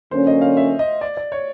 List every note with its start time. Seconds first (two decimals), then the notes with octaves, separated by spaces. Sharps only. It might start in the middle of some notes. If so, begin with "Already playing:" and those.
0.11 D3 F#3 A#3 C#4 C5
0.27 D#5
0.41 F5
0.57 E5
0.79 D#5
1.01 D5
1.17 D5
1.32 C#5